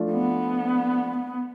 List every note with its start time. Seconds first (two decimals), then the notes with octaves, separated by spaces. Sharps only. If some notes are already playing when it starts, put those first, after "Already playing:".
Already playing: F3 A3 D4 F4
0.12 B3